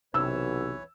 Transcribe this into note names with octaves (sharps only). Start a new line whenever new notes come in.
B1 C3 E3 B4 C#5 E6